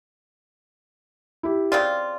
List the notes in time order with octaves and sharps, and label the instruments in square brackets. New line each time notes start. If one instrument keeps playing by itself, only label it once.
[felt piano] E4 G4
[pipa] C#3 C4 F4 [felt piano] D5